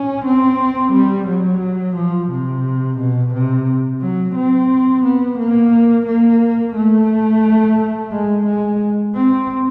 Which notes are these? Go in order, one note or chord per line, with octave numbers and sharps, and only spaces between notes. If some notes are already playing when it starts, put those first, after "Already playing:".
Already playing: C#4
C4
G3
F#3
F3
C3
B2
C3
F#3
C4
B3
A#3
A#3
A3
G#3
G#3
C4